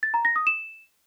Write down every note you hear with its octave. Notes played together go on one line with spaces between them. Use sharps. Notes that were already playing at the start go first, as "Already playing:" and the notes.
A6
A#5
A#6
D#6
E7